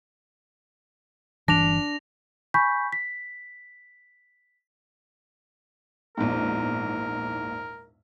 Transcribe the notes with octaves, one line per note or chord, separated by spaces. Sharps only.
G1 C#2 E3 D4 A#6 F7
G#5 B5 C#6 G6 B6
B6
A#1 E2 G#2 A#4